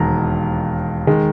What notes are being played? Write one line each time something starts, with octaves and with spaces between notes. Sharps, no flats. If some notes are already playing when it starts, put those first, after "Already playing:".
Already playing: E1 D#2 D#3 A#5
D#3 G#3